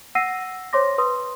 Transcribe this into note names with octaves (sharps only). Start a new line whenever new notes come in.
F#5 E6 A#6 C7 D#7
C5 C#5 C6 D6 A#6
B4 C6 D#6